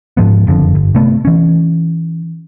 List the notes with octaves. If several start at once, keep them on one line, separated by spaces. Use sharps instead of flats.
G#2 F3 B3
F#1 F2 D3
G1
C3 A3 B3
E3 C#4